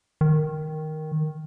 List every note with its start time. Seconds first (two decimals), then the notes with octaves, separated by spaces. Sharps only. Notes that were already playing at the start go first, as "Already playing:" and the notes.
0.21 D#3